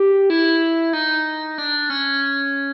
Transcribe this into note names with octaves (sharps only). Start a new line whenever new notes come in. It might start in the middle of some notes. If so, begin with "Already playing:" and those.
Already playing: G4
E4
D#4
D4
C#4